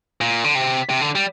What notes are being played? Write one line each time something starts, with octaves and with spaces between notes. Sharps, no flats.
A#2
D3
C3
C3
D3
G3